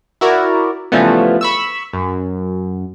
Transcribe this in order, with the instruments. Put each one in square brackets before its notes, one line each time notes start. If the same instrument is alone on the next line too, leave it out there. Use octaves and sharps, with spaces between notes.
[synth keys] E4 F#4 A#4 D5
C#3 E3 F3 G3 A3 B3
B5 C#6 E6
F#2